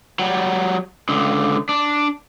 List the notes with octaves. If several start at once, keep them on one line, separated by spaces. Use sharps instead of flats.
F#3 G3
C#2 D3
D4